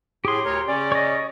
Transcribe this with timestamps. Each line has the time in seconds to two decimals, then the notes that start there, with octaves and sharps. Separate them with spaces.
0.25 A2 G4 G#4 C6
0.45 D2 A#4 C#5
0.68 C#3 C#4 D5
0.92 C#5 D#5